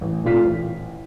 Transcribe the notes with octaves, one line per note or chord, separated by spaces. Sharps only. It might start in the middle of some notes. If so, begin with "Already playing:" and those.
A1
A#2 A3 C4 F4 B6
A1